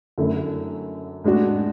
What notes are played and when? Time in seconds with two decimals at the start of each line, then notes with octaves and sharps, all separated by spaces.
0.18 F#2 D3 A3 E4
1.24 A2 G#3 D4 F#4